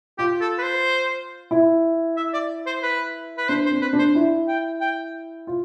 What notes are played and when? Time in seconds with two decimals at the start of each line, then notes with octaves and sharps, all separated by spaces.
0.19 F4 G4
0.41 A4
0.58 B4
0.63 C5
1.51 E4
2.17 E5
2.33 D5
2.67 C5
2.83 B4
3.38 B4
3.49 D4 C5
3.66 C5
3.71 C4
3.82 B4
3.93 D4
3.99 C5
4.15 E4
4.48 G5
4.81 G5
5.47 F4